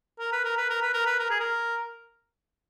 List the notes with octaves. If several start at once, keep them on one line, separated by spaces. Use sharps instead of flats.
A#4
B4
A#4
B4
A#4
B4
A#4
B4
A#4
G#4
A#4